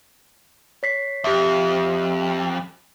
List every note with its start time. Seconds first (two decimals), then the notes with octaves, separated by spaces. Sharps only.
0.83 C#5 B6 C7
1.24 F2 G4 E5